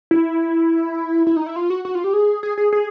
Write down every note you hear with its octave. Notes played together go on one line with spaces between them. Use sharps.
E4
E4
D#4
E4
F4
F#4
F#4
F4
G4
G#4
G#4
G#4
G#4